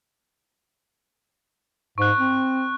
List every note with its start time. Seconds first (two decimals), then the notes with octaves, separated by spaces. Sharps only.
1.98 G#2 C#6 F#6
2.19 C4